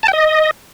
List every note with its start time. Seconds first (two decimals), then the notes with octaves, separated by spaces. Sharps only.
0.03 A5
0.08 G5
0.13 D#5